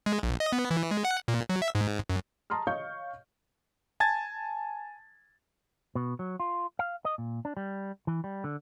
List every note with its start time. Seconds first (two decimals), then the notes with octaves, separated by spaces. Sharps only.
0.06 G#3
0.23 A#1
0.40 D#5
0.52 B3
0.71 E3
0.91 G#3
1.05 F#5
1.28 A#2
1.49 F#3
1.62 E5
1.75 G#2
2.09 F#2
2.50 A5 A#5 C6 D#6 F6
2.67 C#5 D#5 F5 C#6 G6
4.00 G#5 A5 G#6 A6
5.95 B2
6.19 F#3
6.40 F4
6.79 F5
7.05 D#5
7.18 A#2
7.45 D4
7.57 G3
8.07 E3
8.24 G3
8.44 D3